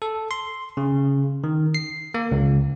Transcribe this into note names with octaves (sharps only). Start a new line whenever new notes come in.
A4
C6
C#3
D#3
C7
A#3
C#2